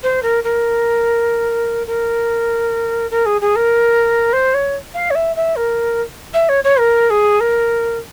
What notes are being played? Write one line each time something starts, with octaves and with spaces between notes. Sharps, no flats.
C5
A#4
A#4
A#4
A#4
G#4
G#4
A#4
C5
C#5
F5
C#5
E5
E5
A#4
E5
C#5
C#5
A#4
G#4
A#4